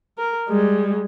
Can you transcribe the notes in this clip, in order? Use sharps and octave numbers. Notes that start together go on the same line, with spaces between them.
A#4
G3 G#3